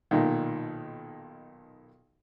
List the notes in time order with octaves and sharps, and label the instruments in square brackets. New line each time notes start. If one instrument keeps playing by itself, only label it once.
[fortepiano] B1 A#2 D#3